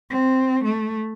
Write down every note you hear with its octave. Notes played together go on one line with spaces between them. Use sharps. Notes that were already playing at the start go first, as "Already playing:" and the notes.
C4
A3